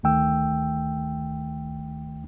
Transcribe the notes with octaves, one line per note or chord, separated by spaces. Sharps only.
D2 D#3 A3 G5 E6